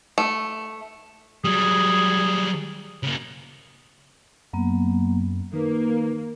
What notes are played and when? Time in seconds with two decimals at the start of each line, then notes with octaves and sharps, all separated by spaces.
0.18 A3
1.44 F#3 G3 G#4
3.03 C#3 A#3
4.53 F#2 F#3 A#3 B3
5.53 D#3 A#3 D#4 B4